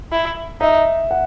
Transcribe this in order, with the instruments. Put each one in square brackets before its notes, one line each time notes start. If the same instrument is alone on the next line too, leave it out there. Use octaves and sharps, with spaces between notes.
[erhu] E4
[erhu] D#4 [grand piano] E5
[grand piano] F#5